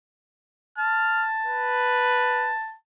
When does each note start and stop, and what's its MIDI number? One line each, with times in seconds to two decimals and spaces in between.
0.78 2.74 81
0.78 1.27 89
1.45 2.54 71